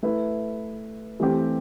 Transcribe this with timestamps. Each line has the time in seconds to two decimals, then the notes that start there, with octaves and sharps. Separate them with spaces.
0.03 A3 E4 B4 E5
1.20 E3 A3 C4 G4